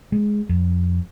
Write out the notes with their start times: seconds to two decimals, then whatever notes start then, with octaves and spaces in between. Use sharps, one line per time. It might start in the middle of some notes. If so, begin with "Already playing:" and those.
0.12 G#3
0.49 F2